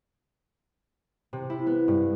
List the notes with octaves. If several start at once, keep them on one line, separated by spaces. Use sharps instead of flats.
C3
E4
B3
G2